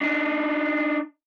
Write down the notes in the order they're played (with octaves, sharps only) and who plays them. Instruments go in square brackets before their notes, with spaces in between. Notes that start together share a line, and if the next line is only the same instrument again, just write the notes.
[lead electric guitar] D4 D#4